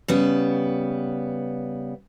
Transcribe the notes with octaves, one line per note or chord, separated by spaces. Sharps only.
C#3 G3 B3